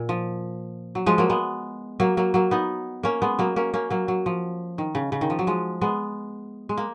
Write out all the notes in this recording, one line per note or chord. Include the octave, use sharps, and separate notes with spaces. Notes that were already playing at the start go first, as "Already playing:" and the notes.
Already playing: A#2
F3
F#3
F3 G#3
F#3 A#3
G#3 B3
F#3 A#3
F#3 A#3
F#3 A#3
B3 D#4
A#3 C#4
G#3 B3
F#3 A#3
A#3 C#4
A#3 C#4
F#3 A#3
F#3
F3
D#3
C#3
C#3
D#3
F3
F#3
F3 G#3
G#3 B3
G#3
A#3